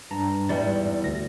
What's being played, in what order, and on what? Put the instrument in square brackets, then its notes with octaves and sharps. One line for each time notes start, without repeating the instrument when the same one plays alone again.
[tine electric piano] G2 A5 A#5
[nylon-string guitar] E2 G3 [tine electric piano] G#2 A6
[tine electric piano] D2 A#6